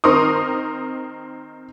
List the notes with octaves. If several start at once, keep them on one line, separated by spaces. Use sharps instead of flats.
D#3 C4 A#4 C6 C#6 D#6